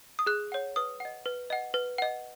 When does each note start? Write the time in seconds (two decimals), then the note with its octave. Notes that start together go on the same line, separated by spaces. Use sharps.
0.19 D#6
0.26 G#4 F#6
0.52 C#5 F#5
0.76 B4 D#6
1.00 D#5 F#5
1.26 B4
1.50 D#5 F#5
1.74 B4
1.98 D#5 F#5